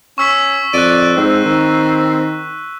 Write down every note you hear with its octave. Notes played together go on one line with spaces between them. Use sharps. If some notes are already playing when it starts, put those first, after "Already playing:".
C#4 C#6 E6 B6
F2 D5 F#6 D#7
G#2 C4
D#3